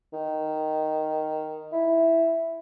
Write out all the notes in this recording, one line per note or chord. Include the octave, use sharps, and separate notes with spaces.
D#3
E4